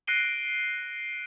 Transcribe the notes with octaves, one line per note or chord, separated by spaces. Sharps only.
F#6 A#6 C7 D7 D#7 G7